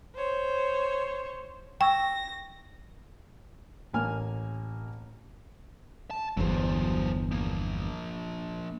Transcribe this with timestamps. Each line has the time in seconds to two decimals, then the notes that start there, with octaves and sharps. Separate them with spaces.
0.16 C5 C#5
1.81 G5 C#6 E6 A#6
3.93 A1 A#3 G#5 F6
6.11 A5
6.37 G1 E2 F#3 C5
7.31 F3 A#3